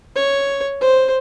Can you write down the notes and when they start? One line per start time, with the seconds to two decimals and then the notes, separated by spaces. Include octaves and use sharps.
0.15 C#5
0.81 C5